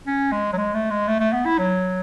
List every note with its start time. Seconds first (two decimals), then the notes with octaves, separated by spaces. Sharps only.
0.07 C#4
0.32 G#3
0.53 F#3
0.57 G#3
0.74 A3
0.91 G#3
1.08 A3
1.20 A3
1.33 B3
1.46 E4
1.58 F#3